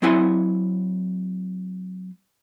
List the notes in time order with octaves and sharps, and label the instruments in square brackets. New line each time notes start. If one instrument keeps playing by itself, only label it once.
[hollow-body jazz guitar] F#3 C4 E4 F#5 G#5 C6